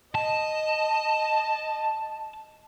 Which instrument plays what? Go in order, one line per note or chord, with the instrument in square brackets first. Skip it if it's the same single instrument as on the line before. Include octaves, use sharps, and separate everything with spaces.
[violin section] D#5 [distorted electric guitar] A5